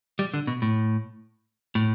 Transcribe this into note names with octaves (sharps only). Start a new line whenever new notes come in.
G3
D3
B2
A2
A2